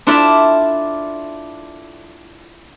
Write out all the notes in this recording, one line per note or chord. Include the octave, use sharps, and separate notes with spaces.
D4 E4 F4 A4 D5 E5